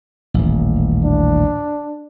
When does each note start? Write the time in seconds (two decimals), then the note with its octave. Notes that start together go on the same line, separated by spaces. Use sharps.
0.34 D#1 A1
1.04 D4